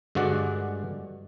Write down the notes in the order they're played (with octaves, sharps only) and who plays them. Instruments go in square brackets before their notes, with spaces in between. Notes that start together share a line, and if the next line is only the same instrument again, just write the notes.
[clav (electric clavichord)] G2 D3 G#3 F#4 D5 F#5